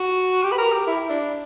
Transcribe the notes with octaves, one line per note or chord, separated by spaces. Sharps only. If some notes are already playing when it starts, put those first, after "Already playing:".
Already playing: F#4
G4
B4
A#4
G4
E4
D4